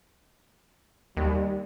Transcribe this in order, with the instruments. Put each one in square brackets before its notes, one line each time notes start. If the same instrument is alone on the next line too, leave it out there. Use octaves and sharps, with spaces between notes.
[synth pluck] D#2 [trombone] G3